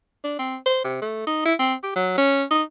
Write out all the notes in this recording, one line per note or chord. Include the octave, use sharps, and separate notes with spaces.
D4
C4
C5
C3
A3
D#4
E4
C4
G4
F#3
C#4
D#4